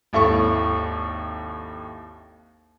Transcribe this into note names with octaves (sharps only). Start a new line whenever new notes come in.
G#1 D#2 E4 A4 C#6